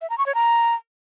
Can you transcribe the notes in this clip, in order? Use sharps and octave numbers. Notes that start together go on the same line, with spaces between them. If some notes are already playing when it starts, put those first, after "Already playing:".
E5
A#5
C#6
C#5
A#5